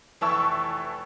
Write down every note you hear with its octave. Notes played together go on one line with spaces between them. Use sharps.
F1 E3 E4 A5 C#6 E6